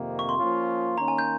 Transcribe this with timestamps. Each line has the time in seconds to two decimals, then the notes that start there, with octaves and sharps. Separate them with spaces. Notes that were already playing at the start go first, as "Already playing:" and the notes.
Already playing: F2 C3 D#3 A#3
0.19 C#6
0.29 C6
0.38 F3 A#3 C#4 F4
0.98 D#3 A#3 C#4 A#5
1.08 G#5
1.18 G6